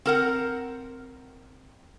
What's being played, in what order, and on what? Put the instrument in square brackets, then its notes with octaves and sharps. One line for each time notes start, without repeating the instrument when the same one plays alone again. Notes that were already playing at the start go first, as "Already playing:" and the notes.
[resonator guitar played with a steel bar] C4 A#4 F#5